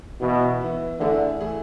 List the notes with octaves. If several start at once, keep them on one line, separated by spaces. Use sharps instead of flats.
B2 E3 B3 E4
E3 B3 E4
D3 E3 A3 E4 G#4
E3 A3 E4 G#4